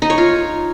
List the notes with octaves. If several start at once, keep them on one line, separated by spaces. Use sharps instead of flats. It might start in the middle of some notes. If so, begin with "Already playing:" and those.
D#4
C#5
F4